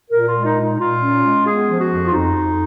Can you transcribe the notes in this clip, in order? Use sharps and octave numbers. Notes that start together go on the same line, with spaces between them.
A#2 A#4
F4
G#3
D#4
A#2
D#4
A#2 F4
C#4
G#3
B3 G#4
F3
F#4
F2
F4
F2 D#4
F2